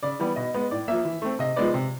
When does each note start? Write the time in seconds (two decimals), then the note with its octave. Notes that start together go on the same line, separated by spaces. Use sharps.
0.03 C#3 D5
0.20 E3 G3 B3
0.36 B2 D#5
0.54 G#3 B3
0.71 A2 D5
0.88 F3 A#3 E5
1.05 E3
1.22 A3 C4
1.39 C3 D#5
1.56 F3 G#3 B3 D5
1.74 C3